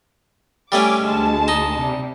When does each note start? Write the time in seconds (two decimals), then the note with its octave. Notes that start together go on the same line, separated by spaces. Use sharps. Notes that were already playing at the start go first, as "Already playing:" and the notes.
0.72 G3 A3 C#4 G#5 D6
1.02 D2 G#3 A5
1.48 D#4
1.79 C3 G3